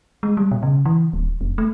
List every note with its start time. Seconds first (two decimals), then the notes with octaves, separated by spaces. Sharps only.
0.23 G#3
0.37 G3
0.51 B2
0.63 C#3
0.85 E3
1.13 D1
1.41 F1
1.58 A3